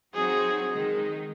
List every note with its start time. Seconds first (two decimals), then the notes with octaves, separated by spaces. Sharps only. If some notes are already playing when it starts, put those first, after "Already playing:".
0.15 F#3 C4 D#4 F#4 G#4
0.70 D#3 G#3 D#4